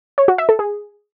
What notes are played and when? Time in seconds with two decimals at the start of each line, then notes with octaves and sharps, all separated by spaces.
0.18 C#5
0.28 F#4
0.38 E5
0.49 A4
0.59 G#4